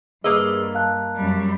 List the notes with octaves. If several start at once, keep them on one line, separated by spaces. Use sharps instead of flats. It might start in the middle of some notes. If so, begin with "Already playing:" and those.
G2 A#3 G#4 B4 D#5 E6
F5 A5 F#6
F#2 G3